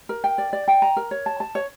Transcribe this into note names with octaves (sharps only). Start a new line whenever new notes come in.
A#4
G5
D5
D5
G5
A#5
A#4
C#5
A5
A5
C#5